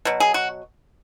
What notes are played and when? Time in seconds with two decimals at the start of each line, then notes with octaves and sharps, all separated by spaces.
0.05 B2 F#3
0.20 G#4
0.34 F#4